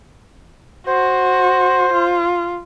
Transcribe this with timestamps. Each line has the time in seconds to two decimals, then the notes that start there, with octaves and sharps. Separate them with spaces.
0.87 F#4 C5
1.93 F4